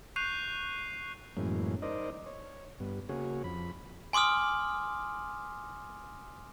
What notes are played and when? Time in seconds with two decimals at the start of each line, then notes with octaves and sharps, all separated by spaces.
0.16 C#6 F#6 G6 C7 D#7 F7
1.37 F#2 A2 E3 G#3 A#3 C#4
1.82 D#4 A#4 C5 D5 D#5
2.26 C#5
2.80 G2 B3
3.09 C#3 A#3 F#4 G#4 C#5
3.44 F2 B5
4.13 G#5 C6 D6 D#6 F6